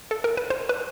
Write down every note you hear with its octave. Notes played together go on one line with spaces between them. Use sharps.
A4
A#4
B4
C5
B4